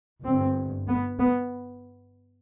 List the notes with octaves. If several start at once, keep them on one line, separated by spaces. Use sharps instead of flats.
G1 G2 C4
B3
B3